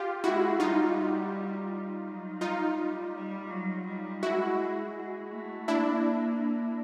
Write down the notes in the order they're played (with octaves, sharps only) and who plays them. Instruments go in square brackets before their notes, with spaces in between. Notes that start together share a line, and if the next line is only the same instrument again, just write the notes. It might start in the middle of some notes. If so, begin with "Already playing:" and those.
Already playing: [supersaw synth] F4 G4
[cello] G#3 [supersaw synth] E4 F#4
[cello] G3 [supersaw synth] D#4 F4
[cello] F#3
[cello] G3 [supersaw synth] D#4 F4
[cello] G3
G3
F#3
G3
[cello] G#3 [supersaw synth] E4 F#4
[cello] G#3
G#3
A3
[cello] A#3 [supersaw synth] D4 E4